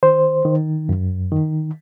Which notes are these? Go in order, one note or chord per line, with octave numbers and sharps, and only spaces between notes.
D#3 C5
D#3
F#2
D#3